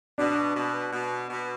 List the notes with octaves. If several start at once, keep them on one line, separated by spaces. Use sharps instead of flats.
B2 D4
B2
B2
B2